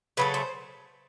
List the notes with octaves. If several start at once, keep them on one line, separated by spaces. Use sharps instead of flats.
C#3 F#3 A3 B4
C5